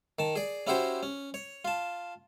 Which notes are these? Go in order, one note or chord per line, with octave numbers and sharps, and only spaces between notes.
D#3 A5
G#4 D5
C#4 E4 F#4 G4 C5
C#4
C#5
F4 A5